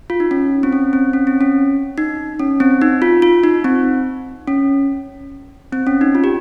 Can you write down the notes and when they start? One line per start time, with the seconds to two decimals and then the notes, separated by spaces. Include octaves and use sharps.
0.10 F4
0.20 D#4
0.31 C#4
0.63 C4
0.73 C#4
0.93 C4
1.13 C#4
1.27 C4
1.41 C#4
1.98 D#4
2.39 C#4
2.60 C4
2.82 D#4
3.02 F4
3.22 F4
3.44 D#4
3.64 C4
4.48 C#4
5.73 C4
5.87 C#4
6.01 D#4
6.15 F4
6.24 G4